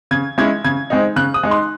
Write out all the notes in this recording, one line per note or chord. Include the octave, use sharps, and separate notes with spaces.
C#3 G#6
G#3 C#4 E4 G#6
C#3 G#6
G#3 C4 D#4
C#3 F#6
D#6
G#3 D#4
C6